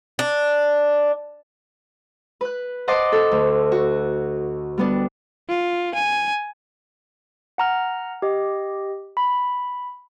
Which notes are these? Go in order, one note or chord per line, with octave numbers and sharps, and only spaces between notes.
D4
B4 F#6
C5 D#5 F#5 A5 C6 D6
A4
D2
F#4
G3 B3 D4
F4
G#5
F#5 A#5 F6
G4 D#5
B5